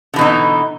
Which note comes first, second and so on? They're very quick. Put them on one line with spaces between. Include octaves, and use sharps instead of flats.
D3 E3 B2 D#4